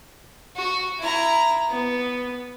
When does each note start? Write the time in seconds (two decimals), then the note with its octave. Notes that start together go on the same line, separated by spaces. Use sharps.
0.56 F#4
1.00 E4 A#5
1.70 B3